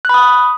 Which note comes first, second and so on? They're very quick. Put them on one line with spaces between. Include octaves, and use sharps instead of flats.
F#6 B5 D#6